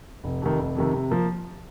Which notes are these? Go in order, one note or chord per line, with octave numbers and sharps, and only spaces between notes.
F1
F2 C3 D#3
F1
F2 C3 D#3
C3
F3 A#3